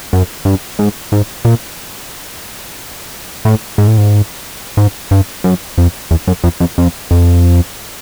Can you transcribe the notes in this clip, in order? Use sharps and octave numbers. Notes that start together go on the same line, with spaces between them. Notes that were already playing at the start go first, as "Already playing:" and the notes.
F#2
G2
G#2
G#2
A#2
A2
G#2
A2
G#2
G#2
G2
F#2
F2
E2
F#2
F2
F2
F2
F2